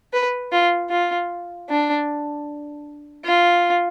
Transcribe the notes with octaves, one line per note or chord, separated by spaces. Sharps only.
B4
F4
F4
D4
F4